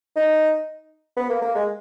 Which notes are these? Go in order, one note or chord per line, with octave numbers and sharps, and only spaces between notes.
D#4
B3
A#3
A#3
G#3